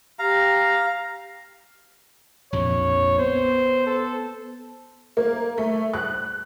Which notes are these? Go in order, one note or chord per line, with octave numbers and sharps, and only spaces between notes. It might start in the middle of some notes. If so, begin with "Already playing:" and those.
G4 F5 A#5
A#1 F2 C#5
B3 C5
A4
A#3
A3
F#6